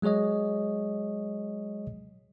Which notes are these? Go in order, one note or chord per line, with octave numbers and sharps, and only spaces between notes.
F#3 G#3 G#4 C#5 D#5